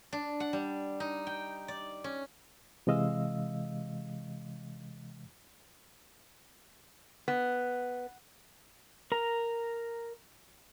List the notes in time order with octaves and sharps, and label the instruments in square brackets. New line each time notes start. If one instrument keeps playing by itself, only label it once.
[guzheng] D4
F#5
G3
D#4
G5
D5
C#4
[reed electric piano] C3 E3 G#3 D#5 F5 E6
[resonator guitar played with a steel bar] B3
[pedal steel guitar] A#4 A#5